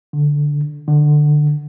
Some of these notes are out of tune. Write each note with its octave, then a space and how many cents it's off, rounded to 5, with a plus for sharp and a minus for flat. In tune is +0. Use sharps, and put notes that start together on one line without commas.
D3 -5
D3 +20